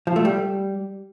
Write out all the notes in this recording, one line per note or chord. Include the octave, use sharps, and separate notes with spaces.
F3
A3
G3